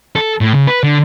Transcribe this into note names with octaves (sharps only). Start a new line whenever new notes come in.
A4
A2
C#3
B4
D3